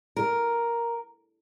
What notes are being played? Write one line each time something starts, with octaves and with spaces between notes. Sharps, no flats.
A#4